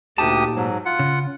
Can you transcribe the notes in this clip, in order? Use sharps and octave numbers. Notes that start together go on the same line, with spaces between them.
D2 A#2 D#4 G4 A5 D#6
G#2 F#3
F4 F#5
C#3